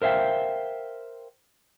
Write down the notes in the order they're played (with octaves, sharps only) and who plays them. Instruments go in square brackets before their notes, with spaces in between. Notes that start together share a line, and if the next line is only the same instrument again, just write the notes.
[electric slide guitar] A#4 C5 E5 F5 G5